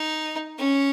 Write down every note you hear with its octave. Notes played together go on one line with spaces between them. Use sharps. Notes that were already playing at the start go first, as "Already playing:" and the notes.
Already playing: D#4
C#4